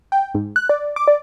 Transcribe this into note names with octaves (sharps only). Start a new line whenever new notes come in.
G5
G#2
F#6
D5
D6
D5